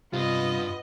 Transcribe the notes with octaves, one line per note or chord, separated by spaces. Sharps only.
G2 C3 B3 F4 D#5